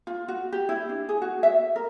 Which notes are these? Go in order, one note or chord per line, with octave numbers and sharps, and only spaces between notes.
F4
F#4
G4
E4
D4
G#4
F#4
E5
A#4